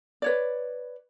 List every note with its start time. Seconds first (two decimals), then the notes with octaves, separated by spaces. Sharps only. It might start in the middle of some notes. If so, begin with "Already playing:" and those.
0.22 B4 C#5 D5